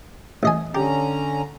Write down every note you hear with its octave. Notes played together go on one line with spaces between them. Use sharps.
A1 D#5 G#5
D3 C#4 G4 A#5